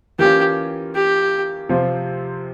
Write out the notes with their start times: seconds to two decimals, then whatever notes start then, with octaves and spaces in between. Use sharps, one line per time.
0.19 E3 A#3 C#4 F4 G4
0.95 G4
1.69 C3 F3 C4 F4